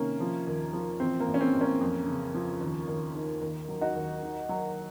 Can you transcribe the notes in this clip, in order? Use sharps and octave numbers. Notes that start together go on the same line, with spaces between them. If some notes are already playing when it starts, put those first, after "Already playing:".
Already playing: C3 D#3 A#3 C#4
F3
D#2
F3
A1 C4
A#3
A1
C#4
C4
A1
A#3 C#4
F2
C#3
F3
D#2
D#2
D#3
D#2
F#3
D#4 F#4
D#2
D#3
F#3